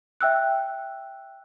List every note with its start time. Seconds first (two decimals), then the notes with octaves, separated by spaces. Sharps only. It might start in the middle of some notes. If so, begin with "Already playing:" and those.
0.21 E5 G5 E6 F#6